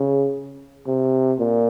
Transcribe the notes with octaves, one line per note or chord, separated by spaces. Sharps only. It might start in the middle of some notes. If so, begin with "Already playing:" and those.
Already playing: C#3
C3
A#2